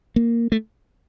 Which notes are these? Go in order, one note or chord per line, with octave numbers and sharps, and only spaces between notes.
A#3
A3